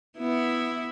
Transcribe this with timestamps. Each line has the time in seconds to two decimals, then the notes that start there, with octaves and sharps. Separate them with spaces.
0.18 B3 E4